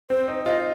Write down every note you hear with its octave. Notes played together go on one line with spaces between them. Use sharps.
C4 C5
D#4
F4 D#5